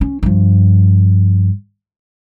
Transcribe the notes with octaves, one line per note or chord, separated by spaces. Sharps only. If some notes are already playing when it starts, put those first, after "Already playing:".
C#4
G2 F3